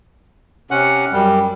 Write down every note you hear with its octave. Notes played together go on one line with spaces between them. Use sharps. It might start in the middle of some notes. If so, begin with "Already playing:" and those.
C3 C#4 F#5
F#2 G3